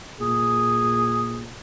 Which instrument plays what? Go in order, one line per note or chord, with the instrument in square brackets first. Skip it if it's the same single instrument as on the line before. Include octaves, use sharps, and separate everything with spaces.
[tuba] A#2 [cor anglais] G#4